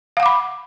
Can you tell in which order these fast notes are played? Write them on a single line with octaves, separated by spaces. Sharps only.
F5 F#5 D6 B5